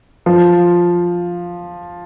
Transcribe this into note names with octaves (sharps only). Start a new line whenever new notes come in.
F3